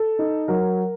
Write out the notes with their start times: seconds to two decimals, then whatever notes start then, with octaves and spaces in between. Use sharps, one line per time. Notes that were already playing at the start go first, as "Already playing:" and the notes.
Already playing: A4
0.19 D#4
0.48 F#3 A#4